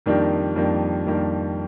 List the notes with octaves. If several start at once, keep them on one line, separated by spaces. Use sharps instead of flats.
F2 D#3 G3 A#3 D4
F2 D#3 G3 A#3 D4
F2 D#3 G3 A#3 D4